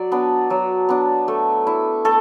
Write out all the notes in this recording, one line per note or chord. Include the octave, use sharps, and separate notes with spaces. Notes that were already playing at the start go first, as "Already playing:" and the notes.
Already playing: F#3 D5
B3 D4
F#3
B3 D4
A3
E4
A3 A4